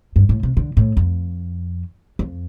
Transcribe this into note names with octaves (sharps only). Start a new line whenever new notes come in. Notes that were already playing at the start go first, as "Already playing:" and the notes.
G2
A2
C3
D3
A2
F2
F2